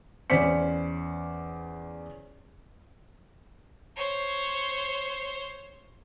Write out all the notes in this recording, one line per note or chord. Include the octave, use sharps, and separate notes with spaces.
E2 C#4 C5 D5 B6 C#7
C5 C#5